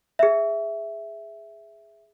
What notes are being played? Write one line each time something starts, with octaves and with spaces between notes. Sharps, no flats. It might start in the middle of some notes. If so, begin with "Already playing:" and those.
G#4 E5